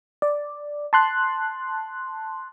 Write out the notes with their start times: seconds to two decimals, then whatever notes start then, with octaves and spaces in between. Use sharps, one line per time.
0.22 D5
0.93 A5 C6 F#6